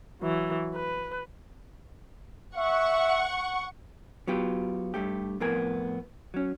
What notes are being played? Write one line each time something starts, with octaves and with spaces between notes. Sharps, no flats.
E3 F#3
B4
E5 F#5 C#6
F#3 B3 F4 G4
G2 A3 G4
F2 A2 B3 A#4 G#5
F#3 C#4